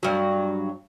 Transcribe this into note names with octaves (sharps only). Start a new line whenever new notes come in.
G2 F#3